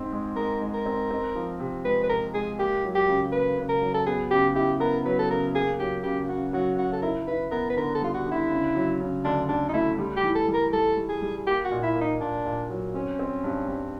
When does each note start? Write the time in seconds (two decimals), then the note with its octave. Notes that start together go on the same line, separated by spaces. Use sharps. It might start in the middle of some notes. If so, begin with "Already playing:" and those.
Already playing: G#2 C4
0.12 G#3
0.36 G#3 A#4
0.61 G#3
0.74 A#4
0.86 C4
1.11 C4
1.35 F3
1.60 C3
1.85 G#3 B4
2.04 B4
2.09 C3 A#4
2.34 G#3 G#4
2.59 A#3 G4
2.84 F#3
2.95 G4
3.08 C#3
3.32 A#3 B4
3.58 C#3
3.69 A#4
3.82 F#3
3.94 A4
4.07 B3 G#4
4.31 C#3 G4
4.55 E4 G4
4.80 B3 A#4
5.05 F#3 B4
5.19 A4
5.30 C#3 A#4
5.55 A#3 G#4
5.80 F#3 G4
6.03 C#3 G4
6.29 C#3 F#4
6.53 F#3 F#4
6.78 C#3 F#4
6.93 A4
7.02 E4 A#4
7.27 E4 B4
7.51 B3 A#4
7.70 B4
7.76 D3 A#4
7.95 A4
8.02 G3 F4
8.14 F#4
8.26 D3
8.31 E4
8.50 C#3
8.75 F#3
9.00 C#3
9.25 D2 D4
9.49 D2 D4
9.69 D#4
9.74 A3 E4
9.98 G3
10.17 G4
10.23 E3
10.35 A4
10.48 G3
10.54 A#4
10.73 G3 A4
10.97 G3
11.09 G#4
11.22 G3
11.46 A#3 G4
11.65 F#4
11.71 A#2
11.83 E4
11.95 A#3
12.01 D#4
12.20 A#2 D4
12.45 A#2
12.70 F#3
12.94 C4 C#4
13.19 C4
13.44 G2
13.68 G2